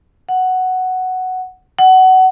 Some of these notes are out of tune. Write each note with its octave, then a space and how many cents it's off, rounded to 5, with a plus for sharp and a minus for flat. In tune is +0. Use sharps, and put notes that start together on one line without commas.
F#5 +5
F#5 +20